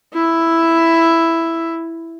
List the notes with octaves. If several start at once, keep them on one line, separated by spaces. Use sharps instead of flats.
E4 E5